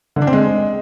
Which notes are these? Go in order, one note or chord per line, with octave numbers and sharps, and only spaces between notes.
D3
D4
C4
G#3